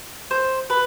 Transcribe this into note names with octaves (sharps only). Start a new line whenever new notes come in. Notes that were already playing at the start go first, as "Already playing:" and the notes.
C5
B4